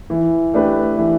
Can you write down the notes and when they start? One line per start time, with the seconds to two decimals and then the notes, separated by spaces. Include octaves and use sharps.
0.10 E3
0.54 A3 D4 G4 B4
0.97 E3